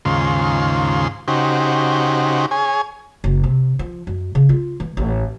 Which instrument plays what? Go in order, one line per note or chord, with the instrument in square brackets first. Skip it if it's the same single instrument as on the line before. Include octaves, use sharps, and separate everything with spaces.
[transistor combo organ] D#2 G#2 C#3 F4 C6
C#3 D#4 F#4 G4 C5
G#4 C#5 G#5
[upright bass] F#1
C3
F3
F#2
C#3
F4
E3
A1